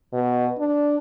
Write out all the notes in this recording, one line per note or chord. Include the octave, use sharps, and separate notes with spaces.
B2
D4